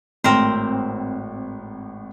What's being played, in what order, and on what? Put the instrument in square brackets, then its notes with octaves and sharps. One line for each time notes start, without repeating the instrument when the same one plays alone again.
[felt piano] G#1 A2 [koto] C4 A#4 C5